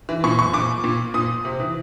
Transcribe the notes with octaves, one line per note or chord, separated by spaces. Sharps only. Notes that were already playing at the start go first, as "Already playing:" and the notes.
E3
A#2 C#6
C#6
A#2 D6
A#2
A#2 D#6
C3
E3